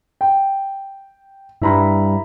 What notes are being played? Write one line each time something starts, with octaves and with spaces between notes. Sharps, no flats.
G5
G2 E4 A#5 B5